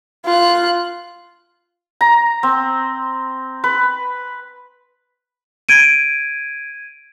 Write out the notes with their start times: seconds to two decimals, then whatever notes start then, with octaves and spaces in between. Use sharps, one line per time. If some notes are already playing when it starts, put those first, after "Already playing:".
0.25 F4 F#6
2.01 A#5
2.43 C4
3.64 B4
5.69 G#6 D7 D#7